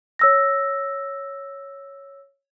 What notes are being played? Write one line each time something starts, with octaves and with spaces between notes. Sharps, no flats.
C#5 E6 A#6